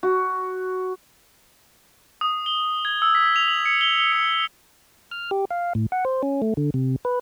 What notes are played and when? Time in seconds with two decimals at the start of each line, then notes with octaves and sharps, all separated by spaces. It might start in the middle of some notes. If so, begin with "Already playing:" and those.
0.03 F#4
2.21 D#6
2.46 G7
2.85 G#6
3.02 E6
3.15 B6
3.36 F7
3.48 F#7
3.65 C#7
3.81 G7
3.98 G7
4.12 C#7
5.11 F6
5.31 G4
5.51 F5
5.75 A2
5.92 F#5
6.05 C5
6.23 C#4
6.42 A3
6.57 D3
6.74 C3
7.05 B4